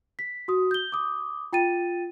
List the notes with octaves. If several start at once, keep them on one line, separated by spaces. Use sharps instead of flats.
B6
F#4 D#6
G6 G7
D6 D#6
F4 G5 A6 D#7